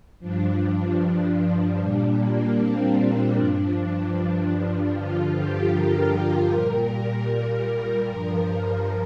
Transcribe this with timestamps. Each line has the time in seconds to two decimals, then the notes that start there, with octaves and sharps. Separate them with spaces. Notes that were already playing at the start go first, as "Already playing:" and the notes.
0.20 G2 F3 D4
1.78 A#2 G3 D4
2.17 A#3
2.57 C4
3.35 G2 F3 D4
4.92 G2 D3 F3 F4
5.33 G4
5.71 A#4
6.51 A#2 G3 A#4
8.09 G2 F3